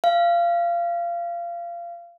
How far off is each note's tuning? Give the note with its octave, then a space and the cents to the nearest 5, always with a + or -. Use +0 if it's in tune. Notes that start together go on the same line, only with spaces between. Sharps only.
F5 -25